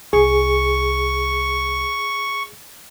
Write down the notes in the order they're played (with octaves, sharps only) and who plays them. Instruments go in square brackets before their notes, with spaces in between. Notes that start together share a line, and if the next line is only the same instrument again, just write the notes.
[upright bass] C2 [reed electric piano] G#4 [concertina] C#6